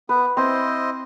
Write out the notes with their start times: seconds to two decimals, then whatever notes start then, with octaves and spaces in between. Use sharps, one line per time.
0.09 B3 B4
0.37 C4 E4 C5 D#5